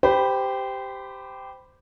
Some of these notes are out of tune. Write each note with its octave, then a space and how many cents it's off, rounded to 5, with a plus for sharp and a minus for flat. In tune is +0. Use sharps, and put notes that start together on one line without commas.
G4 +0 C5 -25 B5 +0